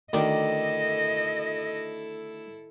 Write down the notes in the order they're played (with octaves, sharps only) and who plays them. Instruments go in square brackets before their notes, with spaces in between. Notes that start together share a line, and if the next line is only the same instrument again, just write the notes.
[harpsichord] D2 D5 A5 [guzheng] D#3 [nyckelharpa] E4 A4 [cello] D#5